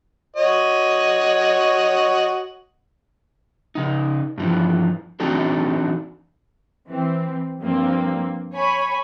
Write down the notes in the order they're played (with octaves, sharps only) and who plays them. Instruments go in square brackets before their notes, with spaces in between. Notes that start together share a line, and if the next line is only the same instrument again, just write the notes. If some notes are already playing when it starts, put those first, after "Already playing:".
[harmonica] F#4 C#5 D#5
[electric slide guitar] C#3 D#4
G2 E3 F3
E3 C4 D4 D#4 F#4 A4
[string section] E3 C4
G2 F3 A#3 C4
C#5 G#5 B5